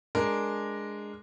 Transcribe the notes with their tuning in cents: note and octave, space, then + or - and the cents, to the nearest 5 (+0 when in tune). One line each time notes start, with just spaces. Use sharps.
G#3 +0 D4 +0 A#4 +0